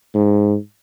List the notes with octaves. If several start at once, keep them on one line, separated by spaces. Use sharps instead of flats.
G#2